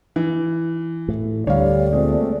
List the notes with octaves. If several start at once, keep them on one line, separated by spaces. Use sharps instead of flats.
E3
A2
D2 D3 G3 C#5 D5 F5
A#2 G#3 A3 C4